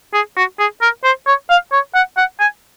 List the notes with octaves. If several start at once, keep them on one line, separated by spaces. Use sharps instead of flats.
G#4
F#4
G#4
A#4
C5
C#5
F5
C#5
F#5
F#5
G#5